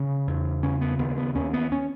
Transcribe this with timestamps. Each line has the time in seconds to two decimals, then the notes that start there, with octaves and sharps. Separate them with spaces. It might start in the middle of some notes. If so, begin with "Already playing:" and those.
Already playing: C#3 C#4
0.27 E2
0.63 C#3 C#4
0.81 B3
0.99 D#2 B3
1.17 B3
1.35 D#2 C#4
1.53 B3
1.72 C#4